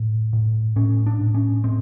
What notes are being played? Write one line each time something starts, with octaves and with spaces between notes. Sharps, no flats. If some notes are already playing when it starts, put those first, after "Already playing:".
Already playing: A2
A2
A2 C#4
D4
A2
C#4
A2 C4